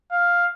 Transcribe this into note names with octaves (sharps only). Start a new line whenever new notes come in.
F5